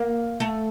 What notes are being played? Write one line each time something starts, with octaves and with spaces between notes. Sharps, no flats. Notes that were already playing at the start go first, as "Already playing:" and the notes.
Already playing: A#3
A3